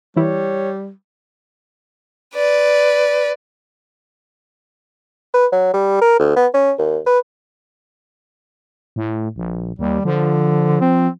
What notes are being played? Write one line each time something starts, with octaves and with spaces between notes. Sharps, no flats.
E3 G3 E4 C#5
B4 D5
B4
F#3
G3
A#4
D2
B3
C#4
D#2
B4
A2
A#1
D#2 G3
D3 F3
C4